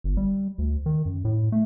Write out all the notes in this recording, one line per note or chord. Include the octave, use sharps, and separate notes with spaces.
G1
G3
D2
D#3
F#2
A2
A3